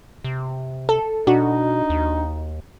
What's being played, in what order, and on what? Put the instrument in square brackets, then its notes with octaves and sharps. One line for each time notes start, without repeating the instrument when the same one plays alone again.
[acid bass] C3
[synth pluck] A4
[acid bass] B2 [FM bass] D4 [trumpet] D#4 [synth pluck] F#4
[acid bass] D#2